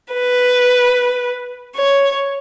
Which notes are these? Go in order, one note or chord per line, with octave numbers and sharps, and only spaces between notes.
B4
C#5